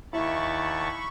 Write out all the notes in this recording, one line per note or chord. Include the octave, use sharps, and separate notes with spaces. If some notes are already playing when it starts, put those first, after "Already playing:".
D#2 E4 A5 B5 C#6